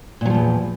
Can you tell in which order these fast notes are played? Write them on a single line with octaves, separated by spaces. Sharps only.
A#2 F#3 F3 E2